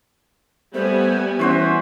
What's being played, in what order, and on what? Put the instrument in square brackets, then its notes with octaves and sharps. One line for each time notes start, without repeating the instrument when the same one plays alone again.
[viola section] G3 B3 G#5 [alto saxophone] A3 [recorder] C5
[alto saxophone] E3 [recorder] C#4 [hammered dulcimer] F#4 C5 C#5